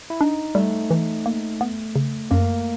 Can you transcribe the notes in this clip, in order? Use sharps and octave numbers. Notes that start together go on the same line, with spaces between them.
E4
D4 D#4
G3 A3
E3
A#3
B3
C#3
F#2 A#3